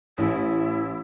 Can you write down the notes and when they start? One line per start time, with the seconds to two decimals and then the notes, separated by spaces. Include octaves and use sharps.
0.18 A1 E4